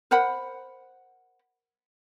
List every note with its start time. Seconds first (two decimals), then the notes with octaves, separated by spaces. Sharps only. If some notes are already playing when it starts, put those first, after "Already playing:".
0.11 A#4 C5 F#5 B5